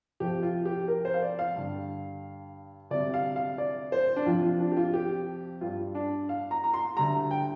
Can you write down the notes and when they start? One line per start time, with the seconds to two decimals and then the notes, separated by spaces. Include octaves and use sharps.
0.20 F2 C3 F3 G4
0.43 F4
0.65 G4
0.88 A#4
1.05 C5
1.14 F5
1.22 D5
1.39 F5
1.56 G2 D3 G3
2.90 D2 C3 G3 D5
3.14 F5
3.36 F5
3.58 D5
3.92 C5
4.16 D4
4.26 F2 C3 F3 F4
4.43 F4
4.60 D4
4.72 G4
4.77 F4
4.94 G4
5.61 G2 G3 F4
5.95 D4
6.29 F5
6.51 A#5
6.64 A#5
6.74 C6
6.96 D2 D3 G3 A#5
7.31 G5